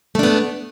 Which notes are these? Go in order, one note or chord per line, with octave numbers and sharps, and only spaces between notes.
A3 B3 D4